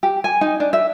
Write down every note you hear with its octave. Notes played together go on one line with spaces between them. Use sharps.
G4
G#5
D#4
D4
E5